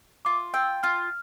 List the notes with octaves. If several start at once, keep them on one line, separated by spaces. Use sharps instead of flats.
F4 D6
G5 E6
F4 F6